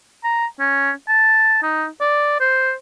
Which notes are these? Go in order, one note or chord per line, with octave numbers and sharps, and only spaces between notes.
A#5
C#4
A5
D#4
D5
C5